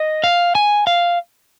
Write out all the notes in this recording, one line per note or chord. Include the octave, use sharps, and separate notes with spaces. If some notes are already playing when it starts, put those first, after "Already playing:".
Already playing: D#5
F5
G#5
F5